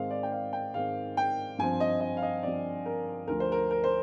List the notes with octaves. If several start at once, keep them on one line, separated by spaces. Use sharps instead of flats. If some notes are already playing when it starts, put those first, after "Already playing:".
Already playing: G#2 D#3 G#3 C4 F5
D5
G5
F5
G5
G#2 D#3 G#3 C4 F5
G5
G2 F3 C4 G#5
D#5
D#5
F5
D#5
G2 F3 C4 D5
A#4
D2 D3 F3 A#4
C5
A#4
A#4
C5